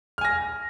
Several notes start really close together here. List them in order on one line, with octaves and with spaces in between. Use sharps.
F6 G#5 A#6